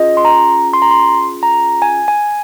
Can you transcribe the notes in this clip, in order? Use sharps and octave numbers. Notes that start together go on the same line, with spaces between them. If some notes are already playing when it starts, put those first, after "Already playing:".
Already playing: C#4 F4 G#4 D#5
C6
A#5
C6
A#5
C6
A#5
G#5
G#5